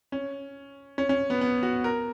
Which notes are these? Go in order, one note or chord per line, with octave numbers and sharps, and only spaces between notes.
C#4
C#4
C#4
B3
B3
F#4
A#4